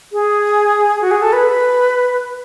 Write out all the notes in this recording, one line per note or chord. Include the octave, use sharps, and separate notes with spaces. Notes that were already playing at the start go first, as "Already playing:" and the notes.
G#4
F#4
G#4
A4
B4